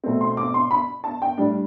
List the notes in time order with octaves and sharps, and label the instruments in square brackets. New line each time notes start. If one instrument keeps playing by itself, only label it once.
[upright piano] B2 A3 C4
C6
D6
C6
B5
A5
G5
A2 G3 D4